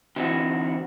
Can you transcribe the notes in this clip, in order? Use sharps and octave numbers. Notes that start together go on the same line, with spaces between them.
D3 E3 C4 D#4 F#4